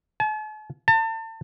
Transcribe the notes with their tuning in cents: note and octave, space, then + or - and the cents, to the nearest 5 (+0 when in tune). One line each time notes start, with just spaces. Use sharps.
A5 -45
A5 +35